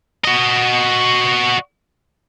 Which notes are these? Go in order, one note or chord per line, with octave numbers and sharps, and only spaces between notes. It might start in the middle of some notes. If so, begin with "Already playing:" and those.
F#4 D#5